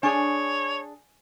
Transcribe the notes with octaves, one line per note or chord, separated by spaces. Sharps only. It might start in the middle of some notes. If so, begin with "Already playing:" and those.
D4 G#4 C#5 G#5 C#6 D6